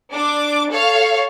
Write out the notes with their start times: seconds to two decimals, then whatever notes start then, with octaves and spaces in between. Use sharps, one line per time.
0.11 D4 D6
0.70 A4 C#5 F5